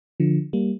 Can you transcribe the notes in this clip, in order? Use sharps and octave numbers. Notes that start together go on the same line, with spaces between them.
D3 F3
G3 A#3